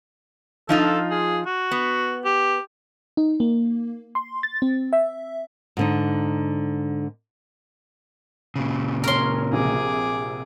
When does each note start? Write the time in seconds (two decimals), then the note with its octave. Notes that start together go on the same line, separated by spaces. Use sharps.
0.69 F3 D#4 F4 A4
1.11 G#4
1.46 F#4
1.71 B3
2.25 G4
3.17 D#4
3.40 A#3
4.15 C6
4.43 A6
4.62 C4
4.93 E5
5.77 G#2 D3 D#4
8.56 A#2 C#3
9.04 A#4 C#5 C6 F6
9.53 A#1 C3 G#4 D6